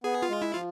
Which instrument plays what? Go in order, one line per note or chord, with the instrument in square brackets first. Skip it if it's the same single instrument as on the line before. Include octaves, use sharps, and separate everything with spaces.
[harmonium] B3 [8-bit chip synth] G#4
[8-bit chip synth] F4
[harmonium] G#3
[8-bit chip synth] E4
[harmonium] F3 [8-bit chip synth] F4